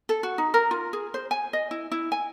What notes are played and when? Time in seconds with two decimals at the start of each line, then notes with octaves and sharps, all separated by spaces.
0.09 A4
0.23 F#4
0.38 D#4
0.54 A#4
0.71 F4
0.93 G#4
1.14 C5
1.31 G#5
1.53 D#5
1.71 E4
1.92 E4
2.12 G#5